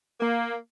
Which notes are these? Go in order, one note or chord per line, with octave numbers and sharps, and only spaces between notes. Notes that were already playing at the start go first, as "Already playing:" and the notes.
A#3